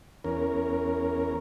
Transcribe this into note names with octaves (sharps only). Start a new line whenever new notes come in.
E2 C#4 A#4